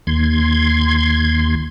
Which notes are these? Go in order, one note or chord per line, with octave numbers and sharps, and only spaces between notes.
D#2 C6 G#6